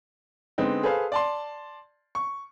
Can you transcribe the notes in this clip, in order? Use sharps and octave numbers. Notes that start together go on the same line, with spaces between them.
D3 G#3 B3 C4 D#4
G#4 A4 B4 C5 F5
D5 A5 C6
C#6